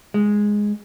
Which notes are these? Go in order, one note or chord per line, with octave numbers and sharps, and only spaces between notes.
G#3